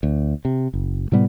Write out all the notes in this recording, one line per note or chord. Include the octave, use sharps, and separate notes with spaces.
D2
C3
F#1
A2 C3 G3 B3